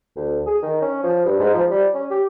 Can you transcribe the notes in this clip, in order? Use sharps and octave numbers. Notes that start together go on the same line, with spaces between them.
D2
G#4
D#3
C#4
F3
G2
G#2
F3
G3
C#4
G4